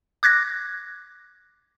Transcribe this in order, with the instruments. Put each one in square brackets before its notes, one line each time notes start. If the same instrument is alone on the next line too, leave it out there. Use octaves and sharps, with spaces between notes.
[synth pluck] D6 F#6 G#6 A#6